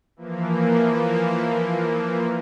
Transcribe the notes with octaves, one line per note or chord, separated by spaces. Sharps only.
E3 F3 A#3